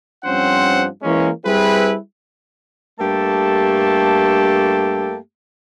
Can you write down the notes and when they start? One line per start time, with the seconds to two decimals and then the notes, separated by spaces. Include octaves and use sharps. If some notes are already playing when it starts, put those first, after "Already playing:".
0.25 G2 F3 C4 C#4 C5 F#5
1.03 E3 G#3 A#3 C#4
1.45 G3 C4 E4 G#4 B4
3.00 G2 A3 A#3 G4 A4 A5